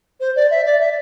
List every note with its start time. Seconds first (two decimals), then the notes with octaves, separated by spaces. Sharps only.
0.20 C5
0.36 D5
0.50 E5
0.66 D5
0.80 E5